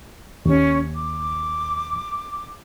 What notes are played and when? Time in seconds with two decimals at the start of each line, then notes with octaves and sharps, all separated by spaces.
0.46 D#2 C#4 C#6
0.94 D6